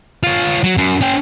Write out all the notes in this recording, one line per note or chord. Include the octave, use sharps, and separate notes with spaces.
F4 C#5
F#3
F#2
C#4 G5